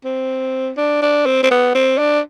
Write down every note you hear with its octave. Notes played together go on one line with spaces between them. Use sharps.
C4
D4
D4
C4
C4
B3
C4
D4